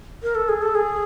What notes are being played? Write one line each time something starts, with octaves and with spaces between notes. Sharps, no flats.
A#4
A4
G#4
A4
G#4